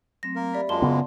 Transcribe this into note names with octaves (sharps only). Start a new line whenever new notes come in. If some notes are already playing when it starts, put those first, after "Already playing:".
F#3 A3 C4 A#6
A#3 A#4
G4 D5 E5 B5 B6
F#2 G#3 A#3 F4 A5 C6 G7
C#3 B3